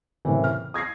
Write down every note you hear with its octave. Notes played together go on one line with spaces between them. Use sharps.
F#1 A2 C3 E3
F6
D#6 G#6 A#6 C7